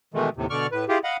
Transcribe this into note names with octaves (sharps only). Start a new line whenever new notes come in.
B2 D#3 E3 G#3 A3
D#2 A2 C3
B2 D3 D5 C#6 F6
A2 B4
E4 F4 G4 G#4
D#5 F5 F#5 B5